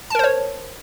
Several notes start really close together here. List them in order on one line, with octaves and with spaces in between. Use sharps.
A5 A#4 C5 C#5